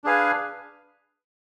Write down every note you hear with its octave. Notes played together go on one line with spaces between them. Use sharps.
D4 G#4 B4 F5 G#5